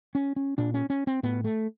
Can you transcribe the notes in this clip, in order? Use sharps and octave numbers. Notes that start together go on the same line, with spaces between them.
C#4
C#4
A#2 D4
C#4
C#4
C4
A2 B3
A3